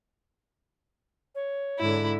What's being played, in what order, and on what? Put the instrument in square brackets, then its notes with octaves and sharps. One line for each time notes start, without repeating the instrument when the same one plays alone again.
[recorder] C#5
[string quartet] G#2 D3 [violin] E4